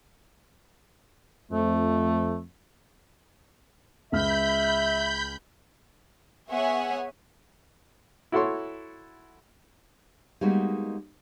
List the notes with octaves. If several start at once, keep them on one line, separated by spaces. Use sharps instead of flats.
F2 A3
C#2 E5 B5 F6 G6
B3 G#4 C#5 E5 F#5 G#5
E4 F#4 A4 C#5 C6 C#6
G3 G#3 A#3 B3 D#4 F#4